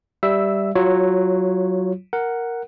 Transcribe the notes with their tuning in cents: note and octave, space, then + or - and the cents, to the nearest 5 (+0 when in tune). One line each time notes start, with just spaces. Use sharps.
G3 +0 E5 +10 E6 -5
F#3 +10 F4 +0 C#5 -10
A#4 +0 F#5 +5